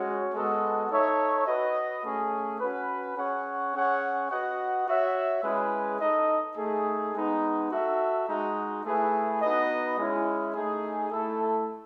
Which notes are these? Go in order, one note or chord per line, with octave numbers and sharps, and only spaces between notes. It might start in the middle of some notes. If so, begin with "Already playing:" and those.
Already playing: G#3 C#4 F#4 C#5
G#3 B3 F#4 A4 D#5
D#4 A4 C#5 E5
F#4 B4 D#5
A3 C#4 G#4
C#4 F#4 B4
C#4 G#4 C#5 F#5
C#4 G#4 C#5 F#5
F#4 B4 D#5 F#5
F#4 C#5 E5
G#3 C#4 E4 G#4 B4
D#4 A4 D#5
A3 D#4 G#4
G#3 B3 D#4
F#4 A4 E5
G#3 D#4 F#4
A3 E4 G#4 B4 E5
B3 D#4 F#4 B4 D#5
G#3 C#4 E4
A3 D#4 G#4
A3 E4 A4